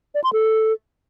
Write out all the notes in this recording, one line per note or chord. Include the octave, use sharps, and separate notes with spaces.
D5
C6
A4